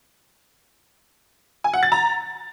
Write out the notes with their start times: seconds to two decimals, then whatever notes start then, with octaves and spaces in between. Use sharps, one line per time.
1.64 G#5
1.74 F#5
1.83 A6
1.92 A#5